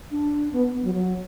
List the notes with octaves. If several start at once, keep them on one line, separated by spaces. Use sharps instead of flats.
D4
B3
B3
F#3
F#3